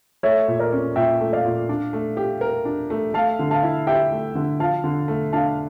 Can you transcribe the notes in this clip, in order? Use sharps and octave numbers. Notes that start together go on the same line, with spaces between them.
A3 C#5 E5
A#2
A#4 D5
C#4
A#2 E5 G5
A3
D5 F5
A#2
D4
A3
G4
A#4
D4
A3
A3 F5 A5
D3
F5 A5
E4
G4 E5 G5
A3
D3
F3 F5 A5
D3
A3
D4 F5 A5